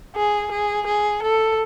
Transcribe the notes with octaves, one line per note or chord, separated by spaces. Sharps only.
G#4
G#4
G#4
A4